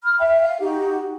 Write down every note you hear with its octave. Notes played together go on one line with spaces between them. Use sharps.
B5 F6
E5 G5
F5
D#4 F#4 G4